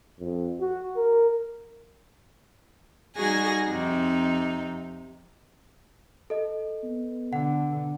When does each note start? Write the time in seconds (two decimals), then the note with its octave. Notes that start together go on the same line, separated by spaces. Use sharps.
0.19 F2
0.60 F#4
0.97 A#4
3.16 G3 D#4 F#4 G#4 G#5 A#6
3.68 F2 C3 D#4
6.30 A4 D#5
6.83 B3
7.33 D3 F#5